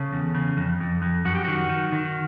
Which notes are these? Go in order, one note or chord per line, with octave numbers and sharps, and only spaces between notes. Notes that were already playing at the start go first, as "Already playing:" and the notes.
Already playing: C#3 A4
E2
C#3
F2
F2
F2
F#2 F#4
G4
D#3 F#4
D#3
D#3